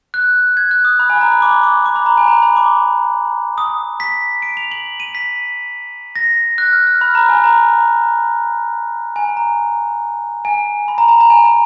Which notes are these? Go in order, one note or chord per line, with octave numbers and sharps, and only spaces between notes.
F#6
G#6
F#6
D#6
B5
G#5
A#5
B5
D6
D6
D6
B5
A#5
G#5
A#5
B5
D6
D#6
B6
D7
F7
F#7
D#7
B6
A#6
F#6
F6
F6
B5
A#5
G#5
A#5
G#5
A#5
G#5
B5
A#5
A#5
A#5
G#5
A#5